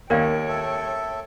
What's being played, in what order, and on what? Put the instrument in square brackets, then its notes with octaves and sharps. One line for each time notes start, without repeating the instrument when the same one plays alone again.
[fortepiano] D#2 [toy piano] A#4 D5 F5 [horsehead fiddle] C#5 G5
[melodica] A4 E5